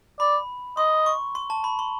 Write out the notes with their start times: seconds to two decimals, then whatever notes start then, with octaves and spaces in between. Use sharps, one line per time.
0.20 D5 B5
0.77 D#5 C6
1.06 C#6
1.35 C6
1.50 A5
1.64 B5
1.79 C6